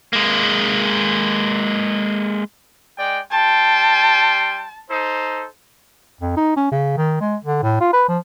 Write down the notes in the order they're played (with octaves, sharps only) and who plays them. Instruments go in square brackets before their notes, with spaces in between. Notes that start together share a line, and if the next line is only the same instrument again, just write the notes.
[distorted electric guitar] G#3 A#3
[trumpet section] G#3 D5 G5
[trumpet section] G3 G5 C6 [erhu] A5
[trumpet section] D#4 A4 C5
[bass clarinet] F2
D#4
C#4
C#3
D#3
G#3
D3
A2
F4
B4
F3